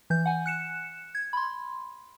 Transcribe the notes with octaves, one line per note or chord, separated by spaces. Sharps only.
E3 G6
F#5 G#5
F#6 C#7 E7
G#6
B5 C6